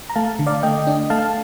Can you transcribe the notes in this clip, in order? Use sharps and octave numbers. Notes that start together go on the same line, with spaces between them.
A#5
A3 F5 A5
D3
D5 F5
A3 D#5 G5
D4
A3 F5 A5